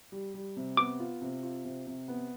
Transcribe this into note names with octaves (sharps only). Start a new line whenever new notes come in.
G3
G3
C3
B3 D6
F4
C3
F4
C3
C3
B3